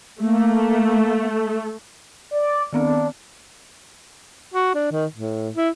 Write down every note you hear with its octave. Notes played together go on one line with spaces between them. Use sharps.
A3 A#3
D5
D#3 B3 C4 D4
F#4
D4
D#3
A2
E4